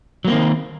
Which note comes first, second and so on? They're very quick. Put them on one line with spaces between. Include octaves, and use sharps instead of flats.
F#3 A#3 C4 D#3